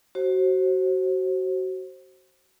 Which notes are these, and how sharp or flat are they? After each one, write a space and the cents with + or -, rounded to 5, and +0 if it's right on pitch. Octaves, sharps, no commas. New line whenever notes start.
F#4 +25 C5 +20